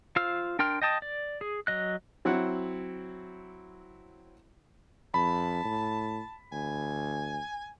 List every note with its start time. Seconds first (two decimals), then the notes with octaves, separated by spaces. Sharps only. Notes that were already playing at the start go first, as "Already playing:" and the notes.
0.16 F4 C5 F5 E6 F6
0.59 D4 A#4 G5 C6 F6
0.82 D#5 G5 A5 D#6
1.02 D5
1.41 G#4
1.67 F#3 D#5 F#6
2.25 F#3 C4 E4 C#5 F#5
5.14 F2 A5 B5
5.64 A2
6.52 D2 G#5